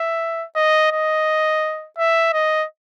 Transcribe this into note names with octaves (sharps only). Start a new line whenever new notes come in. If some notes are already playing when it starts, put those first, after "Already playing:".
Already playing: E5
D#5
D#5
E5
D#5